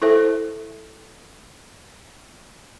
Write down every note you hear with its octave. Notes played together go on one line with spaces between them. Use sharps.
E4 A4 C5 E5